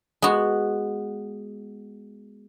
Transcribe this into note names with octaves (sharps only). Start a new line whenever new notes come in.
G#3 B3 F#4